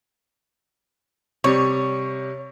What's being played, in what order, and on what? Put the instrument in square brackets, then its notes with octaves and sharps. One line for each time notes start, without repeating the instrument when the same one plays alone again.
[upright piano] C3 G3 [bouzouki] C#5